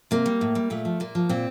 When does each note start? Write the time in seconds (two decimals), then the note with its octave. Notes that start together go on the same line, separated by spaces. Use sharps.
0.11 C3 A#3
0.26 G3
0.41 A2
0.55 G3
0.70 A#2 A3
0.85 F3
1.00 A#2 A#3
1.15 F3
1.29 A#2 C4